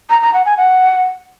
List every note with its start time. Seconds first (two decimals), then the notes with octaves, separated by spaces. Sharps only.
0.10 A#5
0.22 A#5
0.34 F#5
0.46 G#5
0.57 F#5